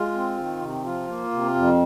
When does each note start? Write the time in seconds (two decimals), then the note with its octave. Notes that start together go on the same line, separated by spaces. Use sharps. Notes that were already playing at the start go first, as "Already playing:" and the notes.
Already playing: G#3 F4
0.14 C4
0.37 D#3
0.61 C3
0.84 F3 F4
1.08 A#3
1.31 C3
1.55 F2